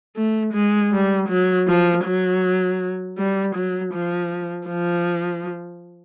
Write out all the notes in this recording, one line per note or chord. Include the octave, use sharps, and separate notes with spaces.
A3
G#3
G3
F#3
F3
F#3
G3
F#3
F3
F3